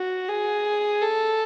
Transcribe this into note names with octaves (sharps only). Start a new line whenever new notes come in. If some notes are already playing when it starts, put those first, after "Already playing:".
Already playing: F#4
G#4
A4